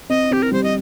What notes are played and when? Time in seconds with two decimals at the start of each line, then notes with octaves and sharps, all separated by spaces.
0.09 C4 D#5
0.31 C4 G4
0.42 A#4
0.51 G3 C5
0.64 D#5